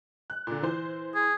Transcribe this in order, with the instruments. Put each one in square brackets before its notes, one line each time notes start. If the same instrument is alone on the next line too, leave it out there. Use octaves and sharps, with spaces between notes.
[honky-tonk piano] F#6
A#2 D3
E3 C5
[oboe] G#4